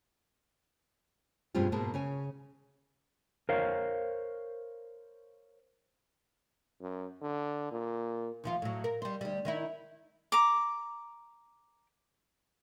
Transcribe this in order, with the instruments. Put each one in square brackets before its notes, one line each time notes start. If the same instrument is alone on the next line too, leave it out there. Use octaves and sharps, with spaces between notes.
[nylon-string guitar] G2 B2 G#3 C4 F4 G4
G#2 B2 G#3 A#3 A#4 A5
C#3 C#5 G#5
[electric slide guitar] A#4 C5 C#5 F5
[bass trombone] F#2
D3
A#2
[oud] D#2 F3 F4
A2 F#3
A#4
G3 C5
D2 G3
D#3 D#4 E4
[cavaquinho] A#5 D6